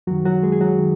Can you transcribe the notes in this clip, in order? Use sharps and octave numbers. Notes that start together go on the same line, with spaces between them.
F#2 D#3 F#3 F#4
F#3 F#4
G#3 G#4
G#4
F#3 F#4
D#3